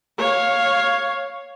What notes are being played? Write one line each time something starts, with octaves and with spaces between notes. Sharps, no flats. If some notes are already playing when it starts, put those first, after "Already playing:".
C#5 F5